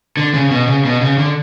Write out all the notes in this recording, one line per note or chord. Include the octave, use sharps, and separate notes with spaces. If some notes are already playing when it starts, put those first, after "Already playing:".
D3
C#3
B2
C#3
B2
C#3
D3